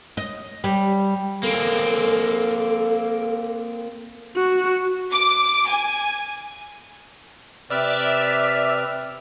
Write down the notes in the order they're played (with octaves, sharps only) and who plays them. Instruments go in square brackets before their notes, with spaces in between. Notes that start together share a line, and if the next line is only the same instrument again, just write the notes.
[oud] D#5
G3
[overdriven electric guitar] A#3 C4 [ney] A4
[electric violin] F#4
[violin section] D6
G#5
[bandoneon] C3 B4 F6 [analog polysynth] D5 E5